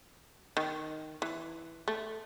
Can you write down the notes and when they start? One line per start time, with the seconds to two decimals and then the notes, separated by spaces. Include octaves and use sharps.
0.57 D#3
1.22 E3
1.88 A3